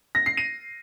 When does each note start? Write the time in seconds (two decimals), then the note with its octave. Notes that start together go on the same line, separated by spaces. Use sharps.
0.15 A#6
0.26 C7
0.37 D#7